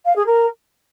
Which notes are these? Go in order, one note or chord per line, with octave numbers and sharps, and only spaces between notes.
F5
G#4
A#4